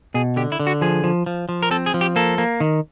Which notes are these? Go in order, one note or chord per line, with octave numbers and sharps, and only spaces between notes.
B2 G#4
D3 G4
E4
D3
F#4
F3 G#4
F3
F3
F3
A#4
C4 A4
G#4
F3
G4
A#3 A4
A#3
D#3